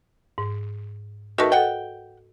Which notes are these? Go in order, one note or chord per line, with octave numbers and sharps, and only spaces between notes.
G#2
D#3 A3 F#4 A#4 B4
A4 D#5 F#5 G5